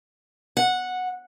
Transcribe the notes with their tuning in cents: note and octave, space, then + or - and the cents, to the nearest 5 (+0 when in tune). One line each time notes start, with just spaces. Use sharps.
F#5 -10